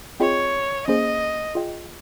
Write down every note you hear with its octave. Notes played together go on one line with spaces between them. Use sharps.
C4 F4 G#4 C#5 D#5 G5
A#3 C#4 G#4 C5 D#5
F4 G#4 D#5 G5